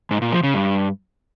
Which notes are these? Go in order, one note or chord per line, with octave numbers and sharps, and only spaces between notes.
G#2
A#2
F3
C#3
G2